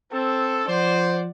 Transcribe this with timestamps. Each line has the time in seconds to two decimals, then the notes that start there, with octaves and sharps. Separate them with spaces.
0.12 C4 A4
0.68 F3 C5 D5 F#5